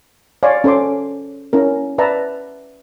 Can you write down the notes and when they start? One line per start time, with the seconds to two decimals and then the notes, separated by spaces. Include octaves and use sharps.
0.43 C#5 D5 F5 G#5 C6
0.64 C#4 A4 C5 C6 D6
1.53 C#4 E4 A#4
1.98 B4 D5 E5 A5 A#5